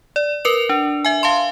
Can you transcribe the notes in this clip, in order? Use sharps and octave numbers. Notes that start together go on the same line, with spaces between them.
D5
A#4 B4 F7
D4
E5 G#5
F5 A5 C6